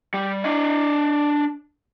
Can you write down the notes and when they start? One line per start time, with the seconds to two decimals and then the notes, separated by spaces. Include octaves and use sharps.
0.14 G3
0.44 D4 D#5